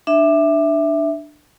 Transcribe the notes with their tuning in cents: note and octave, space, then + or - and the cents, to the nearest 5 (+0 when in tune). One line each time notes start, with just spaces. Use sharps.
D4 +15 E5 +0